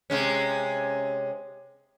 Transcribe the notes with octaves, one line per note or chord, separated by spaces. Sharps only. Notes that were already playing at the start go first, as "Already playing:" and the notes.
C3 G#3 C#4